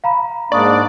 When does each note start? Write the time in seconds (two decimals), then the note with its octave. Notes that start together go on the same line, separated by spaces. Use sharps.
0.04 F5 A#5 B5
0.52 G#2 A#3 D4 D5 C#6 D#6